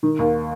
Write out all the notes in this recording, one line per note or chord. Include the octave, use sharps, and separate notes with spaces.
D#3
D#2